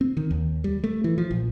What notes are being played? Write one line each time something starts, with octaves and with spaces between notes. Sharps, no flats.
C4
D#3
D#2
G3
A3
E3
F3
A#1